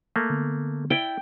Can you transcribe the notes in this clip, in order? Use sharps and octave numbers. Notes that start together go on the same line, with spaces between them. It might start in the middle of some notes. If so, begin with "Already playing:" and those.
A3 A#3
D3 B3
E4 D5 G5